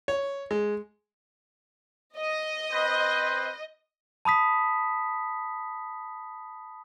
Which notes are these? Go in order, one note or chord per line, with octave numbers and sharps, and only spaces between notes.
C#5
G#3
D#5
C4 B4 C5
A5 B5 D#6 B6